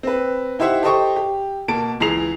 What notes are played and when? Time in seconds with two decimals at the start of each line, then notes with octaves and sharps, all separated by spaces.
0.03 C4 B4
0.59 D#4 E4 G4 C5 E5 F#5
0.83 G4 A4 C5 D#5 G5 C#6
1.16 G4
1.68 B2 A#3 A5 D7
2.00 C#2 E3 G#4 A#5 C7 F7